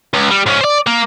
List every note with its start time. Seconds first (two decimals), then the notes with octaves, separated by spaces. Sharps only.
0.14 C#2
0.31 G3
0.46 G#2 C#4
0.61 C5 D5
0.87 A#3